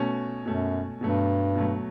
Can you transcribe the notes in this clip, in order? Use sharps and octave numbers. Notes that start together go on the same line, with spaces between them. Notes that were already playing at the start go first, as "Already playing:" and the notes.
Already playing: B2 A3 C#4
F#2 B2 A3 C#4
G2 B2 F#3 A3
B2 F#3 A3